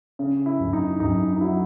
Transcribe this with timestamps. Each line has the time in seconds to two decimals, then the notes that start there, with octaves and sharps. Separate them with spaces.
0.19 C#3
0.46 E4
0.60 F#2
0.73 D#4
1.00 F#2 D#4
1.33 D#4
1.41 F#3 E4